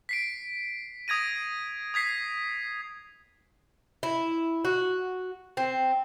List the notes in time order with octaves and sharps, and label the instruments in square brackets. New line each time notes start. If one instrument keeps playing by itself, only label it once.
[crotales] B6 C7 D7
D#6 G#6 A#6 D#7
D#6 G#6 B6 C7
[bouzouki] E4
F#4
C4